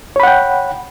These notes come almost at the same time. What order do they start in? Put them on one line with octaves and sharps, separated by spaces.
C#5 B5 F#5 G5